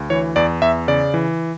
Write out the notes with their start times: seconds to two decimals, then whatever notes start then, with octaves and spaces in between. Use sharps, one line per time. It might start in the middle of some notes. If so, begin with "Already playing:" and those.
Already playing: D2
0.10 E3 C#5
0.36 E2 D5
0.62 E2 E5
0.88 C#3 D5
1.14 E3